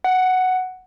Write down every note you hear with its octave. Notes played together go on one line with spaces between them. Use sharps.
F#5